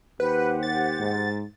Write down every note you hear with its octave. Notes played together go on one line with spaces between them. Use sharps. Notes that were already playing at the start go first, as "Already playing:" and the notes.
D#2 G4 B4 C5 F#5
A6
G#2